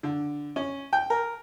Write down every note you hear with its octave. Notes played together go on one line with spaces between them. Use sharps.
D3
C#4
G5
A#4